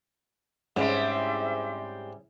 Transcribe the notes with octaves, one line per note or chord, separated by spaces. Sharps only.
G#2 G3 C4 C#4 E4 G#4 E5